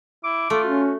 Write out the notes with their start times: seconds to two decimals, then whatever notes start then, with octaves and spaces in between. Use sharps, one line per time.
0.24 E4 D6
0.50 A3 F4
0.64 C#4 F#4